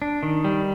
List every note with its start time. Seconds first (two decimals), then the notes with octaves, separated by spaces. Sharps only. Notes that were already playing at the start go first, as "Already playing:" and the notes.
0.02 D4
0.23 D#3
0.45 G3